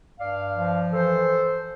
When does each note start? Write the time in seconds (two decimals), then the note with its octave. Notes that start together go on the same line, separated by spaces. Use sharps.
0.18 G2 D5 F5
0.55 F3
0.91 E3 A4 C5